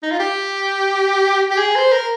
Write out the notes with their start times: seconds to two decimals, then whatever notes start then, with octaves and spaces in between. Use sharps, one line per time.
0.03 D#4
0.11 F4
0.20 G4
1.51 G4
1.58 G#4
1.76 C5
1.92 A#4